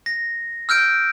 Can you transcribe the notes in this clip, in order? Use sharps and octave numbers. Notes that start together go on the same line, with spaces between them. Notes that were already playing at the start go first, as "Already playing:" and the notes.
A#6
E6 F6 G6 D7